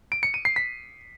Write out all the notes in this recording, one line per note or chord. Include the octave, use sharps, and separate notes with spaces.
D7
C#7
D#7
C7
B6